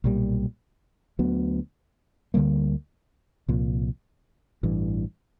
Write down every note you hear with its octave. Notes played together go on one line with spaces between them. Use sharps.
B1 A#2 G3
D2 D3 F#3 B3
D2 D3 G3 A#3
C2 A#2 F3
A1 G2 E3